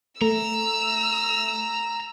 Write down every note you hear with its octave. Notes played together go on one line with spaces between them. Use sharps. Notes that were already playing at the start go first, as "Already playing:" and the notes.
A3 A#5 E6